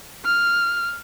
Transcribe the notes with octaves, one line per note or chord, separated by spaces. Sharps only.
F6